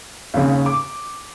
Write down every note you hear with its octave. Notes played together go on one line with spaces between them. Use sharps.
D#2 C#3
D6